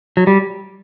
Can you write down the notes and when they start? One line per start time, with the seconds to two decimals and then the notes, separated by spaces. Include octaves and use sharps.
0.17 F#3
0.27 G3